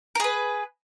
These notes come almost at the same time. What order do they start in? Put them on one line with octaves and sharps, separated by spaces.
A#4 G#4 B4